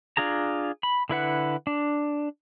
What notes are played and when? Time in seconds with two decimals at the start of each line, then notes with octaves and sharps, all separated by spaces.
0.17 D4 F4 G#4 A#5
0.83 B5
1.09 D3 E4 B4 F#5
1.67 D4